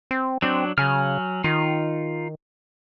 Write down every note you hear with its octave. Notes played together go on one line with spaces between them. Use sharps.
C4
F#3 C4 D4
C#3 F#3 G#5 F6
D#3 D#4 F4